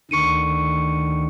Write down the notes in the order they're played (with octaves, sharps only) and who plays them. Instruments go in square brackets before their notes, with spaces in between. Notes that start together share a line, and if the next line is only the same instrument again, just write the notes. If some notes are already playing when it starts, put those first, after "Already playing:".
[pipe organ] D2 D3 D#3 [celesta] C#6 C#7 D#7